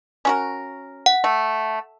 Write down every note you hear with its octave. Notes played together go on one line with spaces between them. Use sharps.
C#4 F#4 A#4
F#5
A3